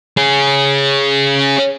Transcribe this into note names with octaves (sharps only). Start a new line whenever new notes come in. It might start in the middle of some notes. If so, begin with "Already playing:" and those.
C#4 G#4